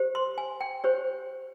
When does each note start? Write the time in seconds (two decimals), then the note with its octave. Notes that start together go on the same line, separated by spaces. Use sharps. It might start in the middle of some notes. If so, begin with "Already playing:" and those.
Already playing: G4 C5
0.15 C6
0.38 G#5
0.61 G5
0.84 G4 C5 C#5